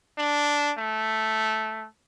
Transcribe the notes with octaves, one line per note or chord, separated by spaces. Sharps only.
D4
A3